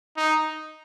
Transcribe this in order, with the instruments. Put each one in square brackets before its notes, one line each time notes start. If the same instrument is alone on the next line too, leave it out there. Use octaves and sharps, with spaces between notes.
[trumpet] D#4